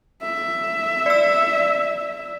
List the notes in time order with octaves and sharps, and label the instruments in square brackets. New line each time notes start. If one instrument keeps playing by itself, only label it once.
[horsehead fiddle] E5
[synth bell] D5 E6